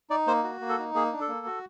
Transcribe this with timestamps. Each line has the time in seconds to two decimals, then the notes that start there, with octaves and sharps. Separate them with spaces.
0.10 D#4 D5
0.27 A#3 C5
0.44 F#4
0.61 A#3
0.69 A4
0.79 D#4
0.94 A#3 G#4
1.12 D4
1.21 A4
1.28 A#3
1.46 F#4